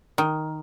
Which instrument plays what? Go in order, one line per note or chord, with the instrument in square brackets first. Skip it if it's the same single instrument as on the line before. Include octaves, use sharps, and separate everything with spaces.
[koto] D#3